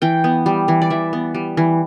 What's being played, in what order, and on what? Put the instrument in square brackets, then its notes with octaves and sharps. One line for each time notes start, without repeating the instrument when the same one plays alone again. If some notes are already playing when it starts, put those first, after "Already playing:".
[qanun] E3 G5
B3
G3
E3
D5
E3 E5
B3
G3
E3